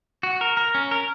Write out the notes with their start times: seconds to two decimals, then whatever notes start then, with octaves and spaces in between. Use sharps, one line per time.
0.23 F#4
0.41 A#4
0.57 A#4
0.75 C#4
0.91 A#4